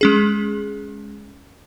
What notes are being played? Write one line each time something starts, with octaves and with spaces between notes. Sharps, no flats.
G#3 C#4 G#4